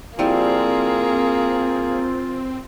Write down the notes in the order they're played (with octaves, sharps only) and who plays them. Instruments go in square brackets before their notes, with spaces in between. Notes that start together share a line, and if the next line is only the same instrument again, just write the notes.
[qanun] F3 G3 E4 [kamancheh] A#3 G#4 [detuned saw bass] C4 [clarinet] F4